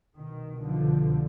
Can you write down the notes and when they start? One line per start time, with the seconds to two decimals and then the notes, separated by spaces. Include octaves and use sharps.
0.16 C2 B2 D#3
0.61 D3 F3